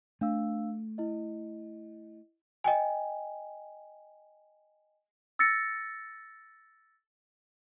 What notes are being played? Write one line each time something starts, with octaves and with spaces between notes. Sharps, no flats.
A3 D4 F5 E6
E4 D#5
D#5 G5 G#5
E6 A6 A#6 C#7